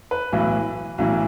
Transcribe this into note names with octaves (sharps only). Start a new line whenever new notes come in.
B4
B1 A2 E3
B1 A2 E3